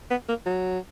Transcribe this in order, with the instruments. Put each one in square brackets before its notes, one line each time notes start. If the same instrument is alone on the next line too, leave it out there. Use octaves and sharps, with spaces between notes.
[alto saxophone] B3
A#3
F#3